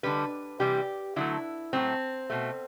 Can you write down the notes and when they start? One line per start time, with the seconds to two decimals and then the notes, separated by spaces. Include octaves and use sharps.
0.03 D3 G3 B4
0.60 C3 E3 G3 G4
1.16 D3 F#3 A3 E4
1.73 A2 F#3 A3 C4
2.30 B2 A3